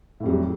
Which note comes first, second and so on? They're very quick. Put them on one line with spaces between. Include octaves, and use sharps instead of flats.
A2 F2 G3 F#3